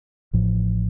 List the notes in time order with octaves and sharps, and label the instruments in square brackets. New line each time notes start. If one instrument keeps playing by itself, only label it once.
[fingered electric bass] A1 A2 F3